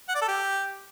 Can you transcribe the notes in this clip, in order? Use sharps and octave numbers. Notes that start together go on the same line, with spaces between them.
F#5
D5
A4
G4